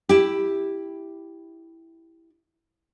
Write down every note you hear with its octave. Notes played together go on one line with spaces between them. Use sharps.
E4 G4